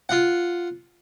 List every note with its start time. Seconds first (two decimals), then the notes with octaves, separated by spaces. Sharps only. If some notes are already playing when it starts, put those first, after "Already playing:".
0.09 F4 F#5